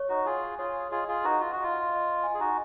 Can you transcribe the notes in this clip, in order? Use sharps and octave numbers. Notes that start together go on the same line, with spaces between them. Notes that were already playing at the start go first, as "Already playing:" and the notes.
Already playing: C#5
D#4 F#4
F4 G#4 G#5
F4 G#4 C#5
F4 G#4 D#5
F4 G#4
D#4 F#4 B4
F4
F#4 D#5
F4
D#5
G#5
G#4
D#4 F#4